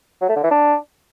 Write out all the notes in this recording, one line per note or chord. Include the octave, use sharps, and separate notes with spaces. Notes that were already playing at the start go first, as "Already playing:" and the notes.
F#3
A3
D3
E3
D4